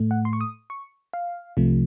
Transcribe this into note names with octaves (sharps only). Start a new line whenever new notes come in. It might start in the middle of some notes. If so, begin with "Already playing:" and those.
Already playing: A2 A3
F#5
C6
C#6
D#6
C#6
F5
C2 C3 F3 A3